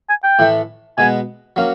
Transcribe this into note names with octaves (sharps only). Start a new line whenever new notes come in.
G#5
G5
A2 E3 A3
B2 G#3 B3 G#5
F#3 A#3 C#4